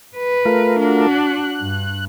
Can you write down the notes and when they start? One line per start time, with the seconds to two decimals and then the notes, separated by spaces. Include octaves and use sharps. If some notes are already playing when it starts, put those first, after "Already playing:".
0.17 B4
0.45 A3 F4 A#4
0.80 D4 F#4
1.11 F#6
1.60 G2